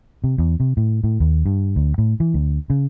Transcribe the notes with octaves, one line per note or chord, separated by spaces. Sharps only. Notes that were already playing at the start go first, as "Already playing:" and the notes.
C3
E2
C3
A2
A2
D#2
G2
D2
A2
E3
D2
C#3